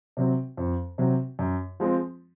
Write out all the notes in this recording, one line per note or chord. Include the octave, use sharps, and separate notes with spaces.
C3 F#3 C4
F2
C3 F#3 C4
F#2
F3 G#3 C4